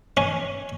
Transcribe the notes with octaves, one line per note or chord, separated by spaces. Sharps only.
C#4